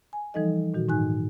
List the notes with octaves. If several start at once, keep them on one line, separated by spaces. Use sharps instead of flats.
G#5
E3 F3 G3 D#4 A4 D#5
A#2 D#3 F#4
G#2 D#4 G#5 F#6